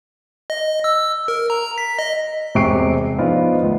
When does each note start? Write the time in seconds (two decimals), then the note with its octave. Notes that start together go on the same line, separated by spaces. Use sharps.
0.50 D#5
0.84 E6
1.28 A#4
1.50 A#5
1.78 B6
1.99 D#5
2.55 E1 C3 G4 C#6 C7 D7
3.18 F3 B3 D4 D#4 F4
3.62 D2